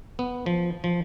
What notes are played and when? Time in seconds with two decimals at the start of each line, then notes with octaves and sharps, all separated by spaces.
0.19 B3
0.46 F3
0.84 F3